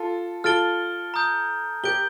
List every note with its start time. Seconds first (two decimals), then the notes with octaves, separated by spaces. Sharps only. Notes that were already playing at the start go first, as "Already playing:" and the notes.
Already playing: F4 A4
0.44 F4 A4 F6 A6 D7 G7
1.14 A#5 D#6 G6
1.83 G4 A#4 G6 D7 G7